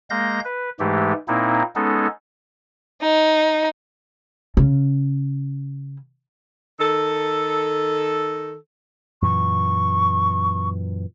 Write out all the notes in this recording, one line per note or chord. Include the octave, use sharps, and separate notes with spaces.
G#3 A#3 F5 G6 A#6
B4
G#2 E3 G#3 A3 G4
A#2 A#3 C4 D#4 E4
G#3 B3 C#4 D#4 A4
D#4
C#3 C#4
D#3 A4
F#2 A#2 E3 C#6